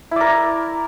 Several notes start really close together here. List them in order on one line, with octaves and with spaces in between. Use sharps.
E4 D5 A#4